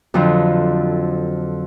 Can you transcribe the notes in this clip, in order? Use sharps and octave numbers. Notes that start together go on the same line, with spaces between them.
F2 D3 F3 F#3